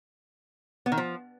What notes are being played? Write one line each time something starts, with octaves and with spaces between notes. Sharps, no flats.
B3
D#3
F3